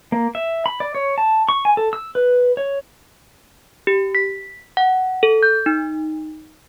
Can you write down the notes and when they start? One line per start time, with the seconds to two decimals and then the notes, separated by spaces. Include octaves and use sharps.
0.12 A#3
0.35 E5
0.66 B5
0.80 D5
0.95 C#5
1.18 A5
1.49 C#6
1.65 G#5
1.77 A4
1.93 E6
2.15 B4
2.57 C#5
3.87 G4
4.15 B6
4.77 F#5
5.23 A4
5.43 G6
5.66 D#4